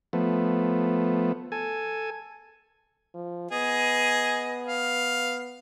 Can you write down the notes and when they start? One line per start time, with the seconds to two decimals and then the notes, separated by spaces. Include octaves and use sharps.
0.13 F3 A3 B3
1.52 A4 G#5
3.14 F3
3.51 B3 G#4 D#5
4.67 F5